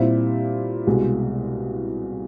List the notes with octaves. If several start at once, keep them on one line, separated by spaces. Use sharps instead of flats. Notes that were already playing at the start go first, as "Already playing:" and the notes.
Already playing: A#2 G3 C4 E4
C2 B2 G#3